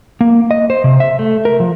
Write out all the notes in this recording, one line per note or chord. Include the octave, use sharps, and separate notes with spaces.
A#3
D#5
C5
C3
E5
A3
A#4
F3